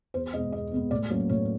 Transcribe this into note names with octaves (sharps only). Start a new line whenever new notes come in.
E2 C5
B2 G#3 B3 D#5
E2 D#5
B2 G#3 B3
A2 D5
F#3 A#3 C#4 C#5
A2 C#5